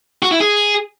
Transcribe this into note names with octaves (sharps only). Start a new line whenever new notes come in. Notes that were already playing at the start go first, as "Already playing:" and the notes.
F#4
E4
G#4